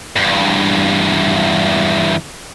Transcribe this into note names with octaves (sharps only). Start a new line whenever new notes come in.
E2 G2